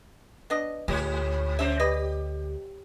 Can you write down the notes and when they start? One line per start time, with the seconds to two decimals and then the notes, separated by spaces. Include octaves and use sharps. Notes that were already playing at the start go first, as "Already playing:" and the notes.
0.50 B3 D4 D#5
0.88 D2 G#2 G#3 G4 C#5
1.59 F#3 G3 C#4 C5 E5
1.80 G4 B4 D5 D#5